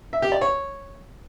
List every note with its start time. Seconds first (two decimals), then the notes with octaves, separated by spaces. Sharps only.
0.13 E5
0.22 G4
0.32 D5
0.41 C#5